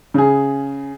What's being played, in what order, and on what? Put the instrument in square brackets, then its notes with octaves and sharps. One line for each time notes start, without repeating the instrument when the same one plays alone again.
[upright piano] C#3 G#4